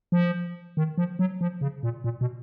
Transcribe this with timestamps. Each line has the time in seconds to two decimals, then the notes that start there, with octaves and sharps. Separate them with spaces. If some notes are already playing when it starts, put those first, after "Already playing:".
0.12 F3
0.77 D#3
0.98 F3
1.19 F#3
1.41 F3
1.61 C#3
1.83 A#2
2.04 A#2
2.21 B2